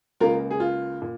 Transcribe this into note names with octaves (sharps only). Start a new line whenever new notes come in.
C#2 C#3 A#3 F4 A#4
G#4
F4
A#2